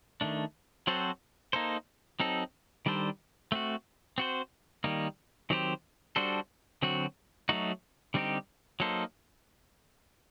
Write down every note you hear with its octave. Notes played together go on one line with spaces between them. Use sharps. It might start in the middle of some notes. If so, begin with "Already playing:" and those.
D#3 A3 D4
F#3 C4 F#4 A4 C5
A#3 D#4 A4 C5
F#3 C4 D#4 A4
D#3 G3 D4 A4 C5
A3 C4 F#4
C4 F#4 C5
D#3 G3 A#3 D#4
D#3 F#3 C4 G4 C5
G3 D4 F#4 A4 C5
D3 F#3 C4 F#4
F#3 A3 D#4 F#4
D3 G3 C4 D#4 G4
F#3 A#3 D#4 A4 C5